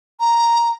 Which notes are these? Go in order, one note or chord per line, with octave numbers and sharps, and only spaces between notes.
A#5